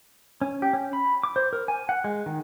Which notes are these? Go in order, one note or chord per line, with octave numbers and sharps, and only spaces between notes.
C#4
G4
C#4
B5
D6
C5
A#4
G#5
F#5
G#3
D#3